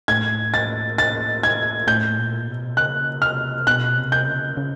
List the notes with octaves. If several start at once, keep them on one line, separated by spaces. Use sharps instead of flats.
A2 G#6
A6
A6
G#6
A2 G6
A#2
B2
C#3 F#6
C3 F6
B2 F#6
C3
G6
C#3
C#3